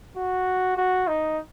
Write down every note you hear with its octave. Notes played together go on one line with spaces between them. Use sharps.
F#4
F#4
D#4